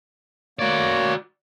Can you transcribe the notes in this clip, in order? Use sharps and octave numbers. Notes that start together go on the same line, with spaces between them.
A#3 F#4 C#5 D5